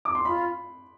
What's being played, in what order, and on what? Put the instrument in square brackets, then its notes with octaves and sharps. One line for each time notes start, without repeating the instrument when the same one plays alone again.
[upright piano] D6
C6
[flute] F4 [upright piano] B5